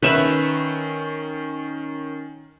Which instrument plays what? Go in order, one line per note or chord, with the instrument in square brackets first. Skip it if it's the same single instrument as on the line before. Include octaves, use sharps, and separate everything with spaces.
[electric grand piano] D#3 C#4 E7 [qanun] B4 E5 B5